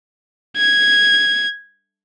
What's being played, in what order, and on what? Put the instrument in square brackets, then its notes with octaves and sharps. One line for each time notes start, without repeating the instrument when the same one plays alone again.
[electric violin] G#6